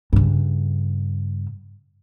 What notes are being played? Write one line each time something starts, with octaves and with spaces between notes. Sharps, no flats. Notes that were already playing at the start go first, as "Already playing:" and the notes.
G2 C#3